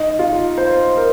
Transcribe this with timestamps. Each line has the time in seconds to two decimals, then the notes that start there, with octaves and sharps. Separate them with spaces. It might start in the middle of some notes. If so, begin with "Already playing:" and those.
Already playing: D#4
0.19 F4
0.58 C5
0.97 A#4